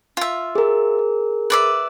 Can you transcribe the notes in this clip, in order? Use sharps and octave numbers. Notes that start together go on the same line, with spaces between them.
F4 E5
G#4 A#4
B4 D5 E5